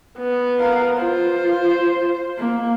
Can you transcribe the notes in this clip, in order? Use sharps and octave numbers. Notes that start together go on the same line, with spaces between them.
B3
A#4 F5
F4 C5
A#3